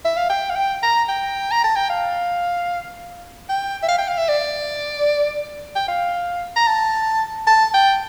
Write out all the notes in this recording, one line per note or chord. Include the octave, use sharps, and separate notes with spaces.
E5
F5
G5
F5
G5
A#5
G5
A#5
A5
G5
F5
G5
E5
F5
G5
F5
E5
D5
G5
F5
A#5
A5
A5
G5